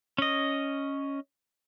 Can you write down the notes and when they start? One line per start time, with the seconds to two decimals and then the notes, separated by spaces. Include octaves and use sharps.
0.18 C#4 D#5